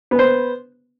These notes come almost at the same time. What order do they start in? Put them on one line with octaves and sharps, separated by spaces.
B3 B4 C5